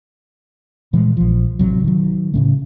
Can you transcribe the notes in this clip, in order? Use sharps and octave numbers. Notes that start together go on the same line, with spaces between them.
A#2 E3 G3 G#3
A#1 F3
A1 C3 F#3
D#3 F#3
A2 C#3 A3